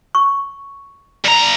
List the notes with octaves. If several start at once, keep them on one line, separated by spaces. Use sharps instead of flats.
C#6
G2 A#5